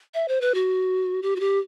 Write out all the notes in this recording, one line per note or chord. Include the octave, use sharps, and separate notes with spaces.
E5
C5
B4
F#4
G4
F#4
G4